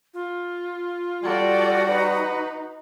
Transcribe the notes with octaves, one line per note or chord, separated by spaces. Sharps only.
F4
G3 F#4 A4 D5
D#4 B4